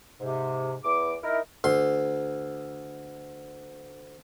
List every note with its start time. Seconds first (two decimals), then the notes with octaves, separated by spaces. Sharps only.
0.20 G#2 C3
0.84 E2 D6
1.24 D#4 E4 A#4
1.64 D2 C6